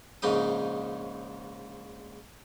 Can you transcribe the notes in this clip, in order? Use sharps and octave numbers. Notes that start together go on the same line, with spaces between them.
A#1 G#2 C#3 D#4 D#6